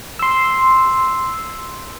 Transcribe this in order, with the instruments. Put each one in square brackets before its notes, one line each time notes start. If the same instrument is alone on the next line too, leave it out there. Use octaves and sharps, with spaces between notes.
[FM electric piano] C6 E6